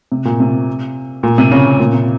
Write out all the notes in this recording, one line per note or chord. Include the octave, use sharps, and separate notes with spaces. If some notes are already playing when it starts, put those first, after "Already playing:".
C3
A#2
C3
A#2
C3
C#3
A#2
C3